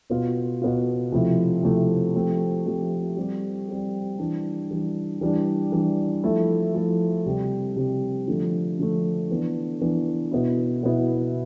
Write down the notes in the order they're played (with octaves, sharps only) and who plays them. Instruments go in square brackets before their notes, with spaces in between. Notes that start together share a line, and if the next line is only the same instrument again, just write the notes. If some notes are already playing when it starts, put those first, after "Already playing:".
[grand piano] B2 B3 F4
B2 B3 F4
C3 F3 A3 E4
C3 F3 A3 E4
F3 A3 C4 G4
F3 A3 C4 G4
G3 C4 G4
G3 C4 G4
E3 G3 D4
E3 G3 D4
E3 G3 D4
E3 G3 D4
F3 A3 E4 A4
F3 A3 E4 A4
C3 G3 C4 G4
C3 G3 C4 G4
D3 F3 A3
D3 F3 A3
E3 B3 D4
E3 B3 D4
B2 B3 E4
B2 B3 E4